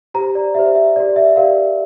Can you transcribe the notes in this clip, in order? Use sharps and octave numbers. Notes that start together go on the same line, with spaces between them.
G4 C5 A#5
D5
G4 C5 E5
E5
G4 A#4 D5
E5
G4 A#4 D5 F5